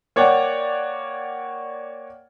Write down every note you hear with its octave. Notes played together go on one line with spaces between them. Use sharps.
A#3 C#5 D5 F#5 G5